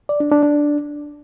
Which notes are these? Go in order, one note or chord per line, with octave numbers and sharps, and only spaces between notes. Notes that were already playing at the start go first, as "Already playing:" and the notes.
D5
D4
D4
D4